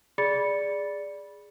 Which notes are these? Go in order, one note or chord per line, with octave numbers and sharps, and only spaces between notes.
G#4 D5 B5 A6 C#7